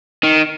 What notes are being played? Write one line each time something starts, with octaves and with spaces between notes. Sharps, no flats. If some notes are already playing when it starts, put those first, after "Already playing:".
D#3